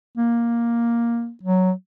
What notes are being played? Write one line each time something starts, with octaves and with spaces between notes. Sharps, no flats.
A#3
F#3